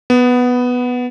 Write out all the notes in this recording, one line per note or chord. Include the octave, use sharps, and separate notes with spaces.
B3